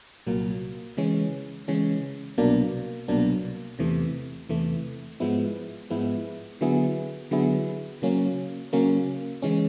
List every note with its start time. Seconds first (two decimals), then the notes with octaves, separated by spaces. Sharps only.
0.27 C2 A#2 F#3 A#3
0.97 C#3 E3 G#3 C#4
1.68 C#3 E3 G#3 C#4
2.38 C2 B2 F#3 A#3 D4
3.08 C2 B2 F#3 A#3 D4
3.79 E2 C3 E3 A3
4.49 E2 C3 E3 A3
5.20 G#2 F3 G#3 B3 E4
5.90 G#2 F3 G#3 B3 E4
6.61 D3 F#3 B3 E4 G#4
7.31 D3 F#3 B3 E4 G#4
8.02 C#3 F#3 A#3 C#4
8.73 C#3 F#3 A#3 C#4
9.42 C#3 E3 G#3 C#4